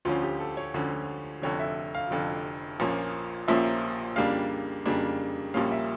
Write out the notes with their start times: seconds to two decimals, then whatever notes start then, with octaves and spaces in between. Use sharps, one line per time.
0.05 D2 D3 F3 C#4 F4
0.23 G4
0.40 A4
0.57 C#5
0.74 D2 D3 F3 C#4
1.42 F1 F2 D3 C#5
1.60 E5
1.95 F5
2.11 F1 F2 D3
2.80 A#1 A#2 F3 A#3 C#4
3.48 A#1 A#2 F3 A#3 C#4 E5
4.16 F2 C#3 G3 A#3 D4 F5
4.86 F2 C#3 G3 A#3 D4
5.54 A#1 A#2 G3 A#3 C#4 F5
5.71 E5